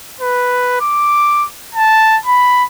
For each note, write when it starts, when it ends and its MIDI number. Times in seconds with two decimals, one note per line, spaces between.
0.20 0.77 71
0.81 1.45 86
1.75 2.17 81
2.26 2.64 83